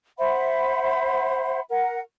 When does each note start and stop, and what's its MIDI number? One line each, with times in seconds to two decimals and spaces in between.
0.18 1.60 72
0.18 1.60 76
0.18 1.60 78
0.18 1.60 83
1.69 2.00 70
1.69 2.00 78